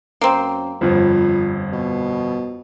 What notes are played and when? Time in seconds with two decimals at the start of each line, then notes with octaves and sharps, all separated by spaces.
0.21 F#2 A#3 C4
0.81 G1 F2 F3
1.73 B2